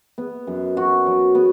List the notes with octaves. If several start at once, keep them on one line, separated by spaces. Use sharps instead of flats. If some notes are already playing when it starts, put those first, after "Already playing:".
B3
F#2
F#4
F#3
B3